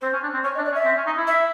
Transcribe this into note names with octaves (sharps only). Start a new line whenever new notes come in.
C4 C5
C#4
D4
C4
C#4 C#5
D#5
D4
D5
C#4
E5
C4
C#4
D#4
E4
E5